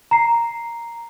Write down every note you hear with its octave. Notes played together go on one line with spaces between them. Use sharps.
A#5 C7